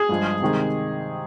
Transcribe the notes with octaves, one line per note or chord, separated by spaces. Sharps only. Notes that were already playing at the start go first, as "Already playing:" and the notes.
Already playing: G#4
G2 F3 G#3
C3 D#3 G#3